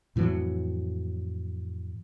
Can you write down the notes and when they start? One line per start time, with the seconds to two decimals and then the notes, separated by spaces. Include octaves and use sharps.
0.16 F2 A2 E3 F#3